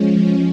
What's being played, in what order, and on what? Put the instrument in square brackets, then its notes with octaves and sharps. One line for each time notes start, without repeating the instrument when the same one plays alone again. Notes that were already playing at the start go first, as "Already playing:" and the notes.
Already playing: [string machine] F3 G#3 C#4